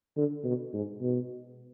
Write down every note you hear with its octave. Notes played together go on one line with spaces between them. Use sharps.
D3
B2
G#2
B2